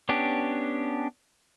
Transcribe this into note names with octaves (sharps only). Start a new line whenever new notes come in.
B3 C#4 D4 G4